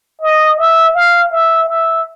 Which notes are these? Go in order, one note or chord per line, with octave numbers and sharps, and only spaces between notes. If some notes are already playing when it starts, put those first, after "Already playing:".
D#5
E5
F5
E5
E5